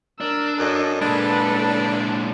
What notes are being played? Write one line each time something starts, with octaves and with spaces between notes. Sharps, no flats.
D4 A#4 E6
F#2 A4 D#5
A#2 G#3 D4 A4 B4